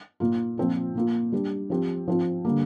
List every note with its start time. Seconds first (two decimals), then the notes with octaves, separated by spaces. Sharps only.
0.20 A#2 A#3 F4
0.58 A#2 F3 C4 F4
0.95 A#2 A#3 F4
1.32 G3 D4 G4
1.70 F3 C4 G4
2.08 F3 C4 F4
2.45 D3 G3 A#3